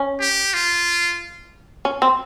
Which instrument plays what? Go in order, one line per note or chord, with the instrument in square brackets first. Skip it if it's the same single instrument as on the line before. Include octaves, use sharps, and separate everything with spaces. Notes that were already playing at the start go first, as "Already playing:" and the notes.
Already playing: [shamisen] C#4
[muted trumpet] G4
F4
[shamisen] C#4
C4